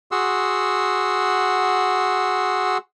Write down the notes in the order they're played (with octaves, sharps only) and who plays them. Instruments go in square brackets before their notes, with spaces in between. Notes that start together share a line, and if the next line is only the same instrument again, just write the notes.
[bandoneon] F#4 G#4 F#5 C6 E6